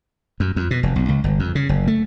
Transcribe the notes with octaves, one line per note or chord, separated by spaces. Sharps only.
F#2
F2
B2
F1
B1
C#2
G1
F2
C#3
F#1
A3